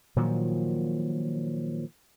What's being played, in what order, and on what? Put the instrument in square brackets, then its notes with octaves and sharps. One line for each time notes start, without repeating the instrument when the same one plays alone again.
[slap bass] A#2 D#3 F3 F#3